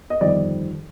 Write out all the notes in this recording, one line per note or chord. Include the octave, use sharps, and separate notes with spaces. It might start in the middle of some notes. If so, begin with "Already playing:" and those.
D#5
G1 F2 D#3 G3 C4 D5